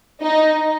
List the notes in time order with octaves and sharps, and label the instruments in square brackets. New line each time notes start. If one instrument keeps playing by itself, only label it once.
[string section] D#4